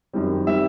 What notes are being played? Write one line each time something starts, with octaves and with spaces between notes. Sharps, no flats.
F#2 D#3 G3 C4
D#3 G3 C4 E5